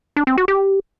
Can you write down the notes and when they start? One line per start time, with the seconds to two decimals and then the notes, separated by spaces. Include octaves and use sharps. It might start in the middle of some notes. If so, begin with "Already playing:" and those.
0.16 D4
0.27 C4
0.38 F#4
0.48 G4